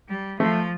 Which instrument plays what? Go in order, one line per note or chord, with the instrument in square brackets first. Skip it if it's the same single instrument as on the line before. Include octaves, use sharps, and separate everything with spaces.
[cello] G3
[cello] F3 [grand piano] A3